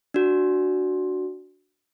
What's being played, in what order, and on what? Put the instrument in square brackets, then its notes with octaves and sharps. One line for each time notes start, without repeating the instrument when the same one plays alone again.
[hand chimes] D4 F#4